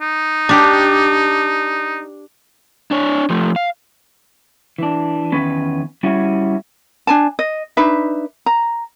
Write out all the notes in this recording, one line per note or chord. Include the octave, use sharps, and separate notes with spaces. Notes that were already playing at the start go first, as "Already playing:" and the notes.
D#4
D4 G4
D4 C#5
F3 A3
F5
E3 D4
E2 D#3 C#4 B4
G3 C#4 E4 F#4
D4 G#5 A5
D#5
D4 D#4 B4 E5
A#5